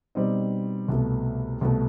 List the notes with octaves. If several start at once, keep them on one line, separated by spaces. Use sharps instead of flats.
B2 G3 C4 D#4
C2 B2 A3
C2 B2 A3